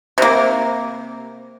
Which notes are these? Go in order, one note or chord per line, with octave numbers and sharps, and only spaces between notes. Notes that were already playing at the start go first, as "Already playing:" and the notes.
C3 A#3